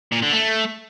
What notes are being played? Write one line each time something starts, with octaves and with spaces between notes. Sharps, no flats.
A#2
D3
A3